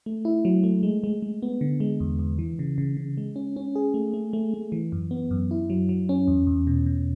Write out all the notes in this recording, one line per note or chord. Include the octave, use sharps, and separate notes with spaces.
A3
E4
F#3
A3
G#3
G#3
G#3
B3
D3
G#3
E2
E2
E3
C#3
C#3
C#3
G#3
C#4
C#4
G#4
A3
A3
A3
A3
E3
F#2
B3
F#2
E4
F#3
F#3
C#4
E2
E2
B2
B2